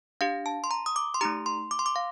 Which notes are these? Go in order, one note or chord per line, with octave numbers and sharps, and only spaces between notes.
D4 G4 F5
A5
C6
A#5
D#6
D6
C6
A3 D#4 G4 A#5
C6
D6
C6
D6
F5